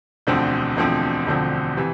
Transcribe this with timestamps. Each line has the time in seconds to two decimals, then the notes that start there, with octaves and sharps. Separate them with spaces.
0.27 E1 D2 D3 F3 C4
0.77 E1 D2 D3 F3 C4
1.26 E1 D2 D3 F3 C4
1.77 C3 E3